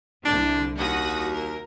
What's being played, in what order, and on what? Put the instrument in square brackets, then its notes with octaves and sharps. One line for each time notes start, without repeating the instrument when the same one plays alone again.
[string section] C2 D3 [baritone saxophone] D4
[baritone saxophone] D#2 [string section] F#4 D#6 A#6
[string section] A#4